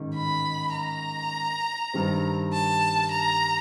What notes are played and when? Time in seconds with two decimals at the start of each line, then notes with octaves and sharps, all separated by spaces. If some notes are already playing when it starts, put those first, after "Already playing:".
Already playing: A1 G#2 D#3
0.16 B5
0.74 A#5
1.93 G2 D#3 G3 C4
2.53 A5
3.11 A#5